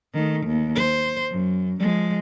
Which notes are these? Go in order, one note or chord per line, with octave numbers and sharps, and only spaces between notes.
D#3 A3
D#2
C5
F#2
F3 G#3